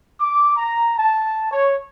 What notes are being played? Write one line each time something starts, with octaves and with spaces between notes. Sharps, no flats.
D6
A#5
A5
C#5